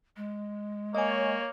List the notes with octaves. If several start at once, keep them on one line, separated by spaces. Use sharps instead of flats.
G#3
A#3 C#5 D#5 G#5